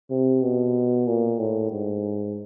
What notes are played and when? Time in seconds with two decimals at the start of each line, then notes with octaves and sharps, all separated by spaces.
0.10 C3
0.42 B2
1.07 A#2
1.39 A2
1.71 G#2